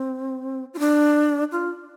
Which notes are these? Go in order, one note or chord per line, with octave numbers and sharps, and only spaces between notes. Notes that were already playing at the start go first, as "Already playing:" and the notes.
Already playing: C4
F4
D4
F4